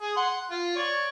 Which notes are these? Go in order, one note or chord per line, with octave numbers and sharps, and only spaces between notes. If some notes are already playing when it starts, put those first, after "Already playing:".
G#4
F#5 C6
F4
C#5 D5